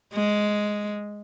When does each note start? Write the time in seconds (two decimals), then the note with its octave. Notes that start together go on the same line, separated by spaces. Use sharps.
0.14 G#3